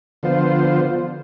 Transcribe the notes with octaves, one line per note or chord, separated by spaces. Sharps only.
D3 F3 B3 F4 C5